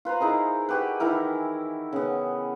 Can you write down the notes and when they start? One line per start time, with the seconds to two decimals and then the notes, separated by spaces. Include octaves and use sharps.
0.05 F4 B4 C5 A#5
0.20 D#4 E4 G#4 A#4
0.69 F#4 G4 B4
1.00 D#3 E3 E4 A#4
1.93 C#3 B3